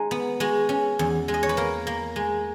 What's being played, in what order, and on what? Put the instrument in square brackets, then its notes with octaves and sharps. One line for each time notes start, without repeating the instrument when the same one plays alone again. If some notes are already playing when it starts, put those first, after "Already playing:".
Already playing: [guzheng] G#3 D#4
B3
G#3 F#4
C#4
E2
G#3
D#5
C#5
B4
A#3 A#4
A#3
G#3